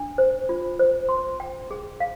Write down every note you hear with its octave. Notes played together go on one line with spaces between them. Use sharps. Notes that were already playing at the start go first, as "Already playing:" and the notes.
Already playing: D4
C5
F4
C5
C6
G5
G#4
F5